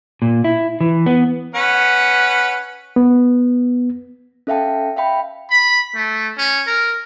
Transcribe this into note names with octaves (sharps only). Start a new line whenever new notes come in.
A#2
E4
E3
B3
C#4 B4 F#5
B3
C#4 A4 E5 F5 G5 A5
E5 F5 G5 B5
B5
A3
C#4
A#4